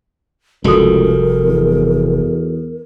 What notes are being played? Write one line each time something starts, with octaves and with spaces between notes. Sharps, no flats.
F1 C#2 G3 F#4 A4 A#4 D#6
E2